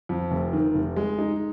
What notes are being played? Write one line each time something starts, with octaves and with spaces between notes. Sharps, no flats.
F2
F1
D#3
F1
G#3
D#4